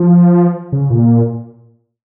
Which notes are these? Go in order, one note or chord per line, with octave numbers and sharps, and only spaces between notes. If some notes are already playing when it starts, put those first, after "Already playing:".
Already playing: F3
C#3
A#2